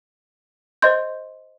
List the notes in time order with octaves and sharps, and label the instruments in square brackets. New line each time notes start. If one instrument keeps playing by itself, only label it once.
[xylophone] C5 D#5 C6 G6